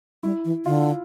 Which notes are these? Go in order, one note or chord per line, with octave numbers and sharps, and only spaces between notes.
G3 E4
E3
D3 F4